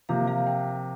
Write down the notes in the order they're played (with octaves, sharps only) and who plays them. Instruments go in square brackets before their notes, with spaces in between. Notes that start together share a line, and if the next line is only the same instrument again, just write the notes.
[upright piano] C3 F3 A#3 [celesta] F5
[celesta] F5
G5